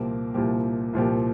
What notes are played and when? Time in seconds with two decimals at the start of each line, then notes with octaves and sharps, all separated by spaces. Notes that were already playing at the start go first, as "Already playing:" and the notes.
Already playing: C2 A#2 F3 A#3 G4
0.34 C2 A#2 F3 A#3 G4
0.93 C2 A#2 F3 A#3 G4